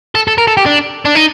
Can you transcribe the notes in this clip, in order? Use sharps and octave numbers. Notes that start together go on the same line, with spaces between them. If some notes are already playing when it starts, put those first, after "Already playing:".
A4
A4
A#4
A4
G4
D4
D4
D#4